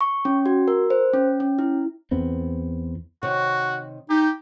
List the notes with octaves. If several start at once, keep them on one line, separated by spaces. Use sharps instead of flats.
C#6
C#4
F#4
A#4
C5
C#4
C#4
E4
E2 B3 C4
C3 D#3 F#4 C#5
D#4 G4